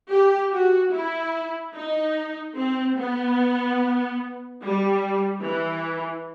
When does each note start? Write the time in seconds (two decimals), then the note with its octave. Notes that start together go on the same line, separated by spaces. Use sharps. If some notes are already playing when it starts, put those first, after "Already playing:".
0.10 G4
0.53 F#4
0.93 E4
1.75 D#4
2.56 C4
2.97 B3
4.61 G3
5.43 E3